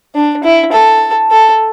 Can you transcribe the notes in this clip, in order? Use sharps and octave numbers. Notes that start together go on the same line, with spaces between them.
D4
E4
A4
A4